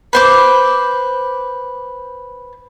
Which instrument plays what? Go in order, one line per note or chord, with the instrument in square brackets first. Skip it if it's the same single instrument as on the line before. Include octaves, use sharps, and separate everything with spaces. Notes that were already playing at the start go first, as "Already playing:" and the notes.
[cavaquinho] B4 C5 D6